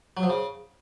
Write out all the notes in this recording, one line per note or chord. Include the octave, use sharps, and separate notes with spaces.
F#3
F3
C#3